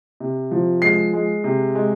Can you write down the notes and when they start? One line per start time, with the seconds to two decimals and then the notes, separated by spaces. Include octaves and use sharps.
0.20 C3
0.51 F3
0.82 G#3 C7
1.13 G#3
1.44 C3
1.75 G#3